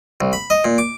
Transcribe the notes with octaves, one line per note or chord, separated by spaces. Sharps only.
C2
B5
D#5
A#2
D6